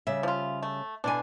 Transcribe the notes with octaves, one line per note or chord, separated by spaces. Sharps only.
C#3 G3 E5
F3 F4
A3
B2 D3 E3 D4 G#5